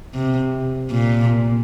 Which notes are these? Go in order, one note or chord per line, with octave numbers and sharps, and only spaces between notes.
C3
A#2